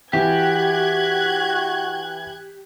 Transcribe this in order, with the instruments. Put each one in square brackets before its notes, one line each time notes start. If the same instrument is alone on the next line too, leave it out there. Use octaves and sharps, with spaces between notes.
[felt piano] E3 [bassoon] F#4 [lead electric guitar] G4 [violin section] F#6 G#6